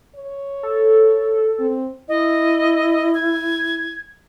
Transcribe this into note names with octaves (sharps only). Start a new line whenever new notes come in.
C#5
A4
C4
E4 D#5
G#6